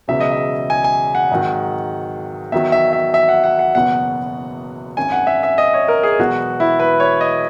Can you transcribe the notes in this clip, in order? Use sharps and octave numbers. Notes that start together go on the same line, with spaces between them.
E1 E2 C#3 F#3 E5
D#5
E5
G#5
G#5
F#5
G#1 G#2 D#3 F#3
E2 D#3 F#3 E5
E5
E5
E5
F#5
F#5
F#5
F#1 E2 B2 F#3 F#5
G#1 F#2 D#3 G#5
F#5
E5
E5
D#5
C#5
A#4
G#4
E1 E2 B2 F#3 F#4
E4
B4
C#5
D#5